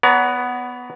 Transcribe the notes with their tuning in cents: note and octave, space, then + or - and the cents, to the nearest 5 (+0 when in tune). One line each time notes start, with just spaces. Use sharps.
B3 +0 C#5 +45 A#5 +0